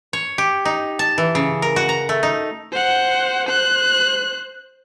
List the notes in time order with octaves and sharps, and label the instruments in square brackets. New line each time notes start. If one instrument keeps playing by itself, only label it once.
[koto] C#5
G4
D#4
A5
E3
C#3
A#4
F#4
A#5
A3
D#4
[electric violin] C5 F#5
C5 F#6